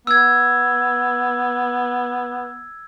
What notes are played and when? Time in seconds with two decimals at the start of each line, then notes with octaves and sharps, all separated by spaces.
0.07 B3 E6 G#6